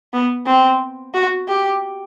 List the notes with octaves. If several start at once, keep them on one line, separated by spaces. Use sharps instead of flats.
B3
C4
F#4
G4